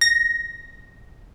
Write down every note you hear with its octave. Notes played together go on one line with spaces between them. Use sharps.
A#6